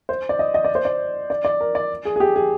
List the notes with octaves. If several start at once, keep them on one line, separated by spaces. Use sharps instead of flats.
C5
D5
D#5
D#5
D5
C5
D5
D5
D5
A#4
D5
G#4
G#4
G4
G#4